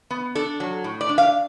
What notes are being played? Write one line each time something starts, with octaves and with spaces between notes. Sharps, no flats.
B3
D4 A4
F#3
A2
D5
D4
F5